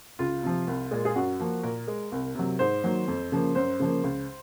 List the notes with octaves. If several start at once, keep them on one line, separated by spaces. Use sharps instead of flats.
C#2 F4
C3 F3
C2
A#2 G#3
G#4
F#2 F#4
F3 A#3
A#2 A#4
G#3
C2
C3 F#3
G#2 C5
D#3 F#3 A#3
F2
C#3 F3 A#3
F#2 C5
C#3 F3 A#3
C#2